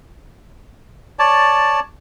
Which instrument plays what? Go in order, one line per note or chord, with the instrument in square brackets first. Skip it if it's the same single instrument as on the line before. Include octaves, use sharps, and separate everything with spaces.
[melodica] C#5 D5 A5